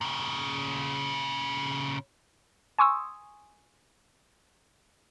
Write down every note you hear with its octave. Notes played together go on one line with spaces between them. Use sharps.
A#2 C#3
G#5 C6 C#6 D#6 E6